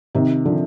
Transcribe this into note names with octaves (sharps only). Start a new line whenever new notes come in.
C3 D#3
D3 F3